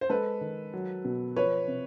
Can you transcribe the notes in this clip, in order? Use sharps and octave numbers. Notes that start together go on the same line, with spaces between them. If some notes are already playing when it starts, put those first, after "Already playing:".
C5
G#3 A4 B4
D#3
F#3
B2
F3 B4 C#5
C3